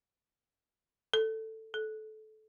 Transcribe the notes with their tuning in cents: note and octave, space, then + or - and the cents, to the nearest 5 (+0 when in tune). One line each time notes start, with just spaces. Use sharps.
A4 +10
A4 -20